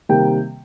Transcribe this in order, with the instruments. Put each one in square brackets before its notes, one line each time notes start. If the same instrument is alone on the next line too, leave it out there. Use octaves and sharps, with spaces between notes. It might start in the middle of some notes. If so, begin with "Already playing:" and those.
[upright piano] C3 D#3 G3 A#3 G5